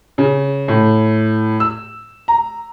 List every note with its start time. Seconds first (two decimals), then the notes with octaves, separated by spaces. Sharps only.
0.18 C#3
0.68 A2
1.60 E6
2.28 A#5